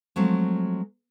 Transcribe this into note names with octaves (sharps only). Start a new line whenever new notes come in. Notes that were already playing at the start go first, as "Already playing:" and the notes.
F3 F#3 G#3 A3 C4